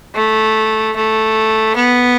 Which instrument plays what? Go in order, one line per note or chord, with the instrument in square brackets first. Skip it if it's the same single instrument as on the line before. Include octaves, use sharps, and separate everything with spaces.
[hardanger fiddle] A3
A3
B3